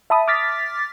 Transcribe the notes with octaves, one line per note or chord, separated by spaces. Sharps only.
E5 A5 B5 D#6
D6 F6 A6 B6